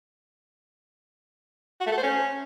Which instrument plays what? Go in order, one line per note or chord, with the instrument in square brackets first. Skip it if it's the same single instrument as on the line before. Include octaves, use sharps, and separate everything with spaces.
[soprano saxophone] F#4
A3
A4
C5
C#4